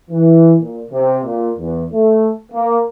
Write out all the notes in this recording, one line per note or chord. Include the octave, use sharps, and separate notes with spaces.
E3
A#2
C3
A#2
E2
A3
A#3